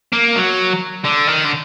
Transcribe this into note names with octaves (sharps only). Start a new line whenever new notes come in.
A#3
F#3
D3
D#3
D3